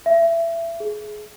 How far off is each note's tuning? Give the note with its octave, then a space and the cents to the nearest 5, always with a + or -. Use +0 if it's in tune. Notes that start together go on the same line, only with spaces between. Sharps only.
E5 +25
G#4 +20